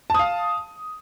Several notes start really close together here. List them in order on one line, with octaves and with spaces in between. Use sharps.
A5 D#6 F5